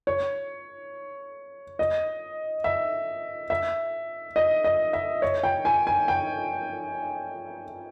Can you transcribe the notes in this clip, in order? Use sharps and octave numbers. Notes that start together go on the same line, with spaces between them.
C#5
D#5
E5
E5
D#5
D#5
E5
C#5
G5
G#5
G#5
G5